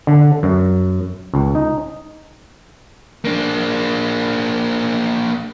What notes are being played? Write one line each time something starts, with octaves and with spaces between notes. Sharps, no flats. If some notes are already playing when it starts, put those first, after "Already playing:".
D3
F#2
C#2
D#4
A#3 D4